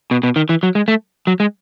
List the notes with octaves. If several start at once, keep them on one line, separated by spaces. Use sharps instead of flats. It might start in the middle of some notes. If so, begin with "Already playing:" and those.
B2
B2
D#3
E3
F#3
G#3
A3
F#3
G#3